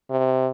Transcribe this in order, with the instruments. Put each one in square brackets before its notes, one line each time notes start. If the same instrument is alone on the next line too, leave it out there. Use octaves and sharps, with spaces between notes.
[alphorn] C3